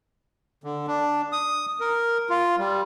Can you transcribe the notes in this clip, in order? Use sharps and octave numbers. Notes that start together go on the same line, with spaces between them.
D3
D4
D#6
A#4
F4
G3